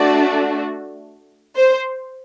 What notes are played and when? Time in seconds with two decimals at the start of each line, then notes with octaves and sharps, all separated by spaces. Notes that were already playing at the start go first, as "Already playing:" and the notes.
Already playing: A3 D4 F#4 D5
1.56 C5